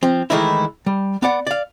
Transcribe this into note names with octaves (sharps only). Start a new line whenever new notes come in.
F3 C4
D#3 E3 G#3 A3 D#4 E4
G3
B3 D5 F#5
D5 F5